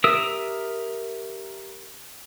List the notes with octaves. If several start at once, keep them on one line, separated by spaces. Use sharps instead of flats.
G4 A#4 E5 D#6 E6